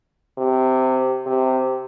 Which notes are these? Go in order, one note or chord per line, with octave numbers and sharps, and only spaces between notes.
C3
C3